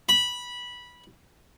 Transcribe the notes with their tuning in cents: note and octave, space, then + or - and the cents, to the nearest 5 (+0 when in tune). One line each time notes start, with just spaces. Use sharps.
B5 -15